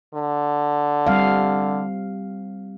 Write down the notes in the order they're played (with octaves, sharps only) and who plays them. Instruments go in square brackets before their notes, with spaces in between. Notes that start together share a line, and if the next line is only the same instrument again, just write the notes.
[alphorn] D3
[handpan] G3 C4 F5